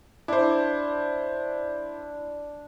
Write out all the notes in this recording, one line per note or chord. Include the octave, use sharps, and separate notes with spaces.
D4 E4 C5